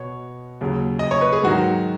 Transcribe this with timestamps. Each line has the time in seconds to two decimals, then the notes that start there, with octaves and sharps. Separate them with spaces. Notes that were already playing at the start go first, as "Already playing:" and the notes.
Already playing: B2 B3 C#5
0.61 D#2 C#3 F#3
0.99 D#5
1.11 C#5
1.21 B4
1.33 G#4
1.44 G#2 D#3 F#3 F#4